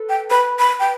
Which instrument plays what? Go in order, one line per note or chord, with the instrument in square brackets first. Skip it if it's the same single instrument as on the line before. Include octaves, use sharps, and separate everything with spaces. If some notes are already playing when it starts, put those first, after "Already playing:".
Already playing: [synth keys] A4 B4
[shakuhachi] G5
[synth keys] B4 [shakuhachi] B5
[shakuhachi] B5
G5